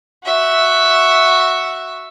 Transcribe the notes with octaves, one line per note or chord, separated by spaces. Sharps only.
F#4 E5